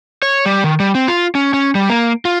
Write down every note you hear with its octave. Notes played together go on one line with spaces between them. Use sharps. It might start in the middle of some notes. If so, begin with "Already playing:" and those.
C#5
G3
D#3
G3
C4
F4
C#4
C#4
G3
A#3
F4